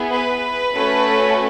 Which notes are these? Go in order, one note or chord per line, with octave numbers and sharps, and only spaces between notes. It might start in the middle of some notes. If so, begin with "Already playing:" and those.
Already playing: B3 E4 G#4
B4
A3 C#4 F#4 A4